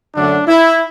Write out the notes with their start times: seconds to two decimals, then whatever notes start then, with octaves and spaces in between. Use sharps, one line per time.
0.15 F#2 D3 F#3 A3 D4
0.48 E4